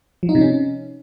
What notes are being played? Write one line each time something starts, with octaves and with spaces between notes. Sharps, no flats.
F3
D#4
C3
C#4